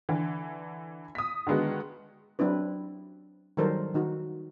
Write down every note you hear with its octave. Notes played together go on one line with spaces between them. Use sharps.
D3 E3
D#6 B6
D3 D#3 G#3 B3 F#4
F#3 C4 D4 E4 B4
D#3 F#3 G3 A4 A#4 C5
D#3 D#4 F#4